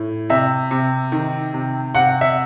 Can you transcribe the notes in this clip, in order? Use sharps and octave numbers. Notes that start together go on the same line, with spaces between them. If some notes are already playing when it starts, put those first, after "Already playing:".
Already playing: A2
C3 E5
C3
D#3
C3
C3 F#5
E5